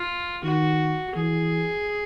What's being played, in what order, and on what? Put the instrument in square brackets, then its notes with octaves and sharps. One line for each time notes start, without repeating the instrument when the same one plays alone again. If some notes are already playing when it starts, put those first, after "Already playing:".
Already playing: [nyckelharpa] F4
[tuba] D#3 [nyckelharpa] F#4
[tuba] E3 [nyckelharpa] G#4